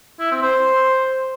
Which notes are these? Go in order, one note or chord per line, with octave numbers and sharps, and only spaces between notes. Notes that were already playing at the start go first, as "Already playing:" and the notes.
E4
C4
C5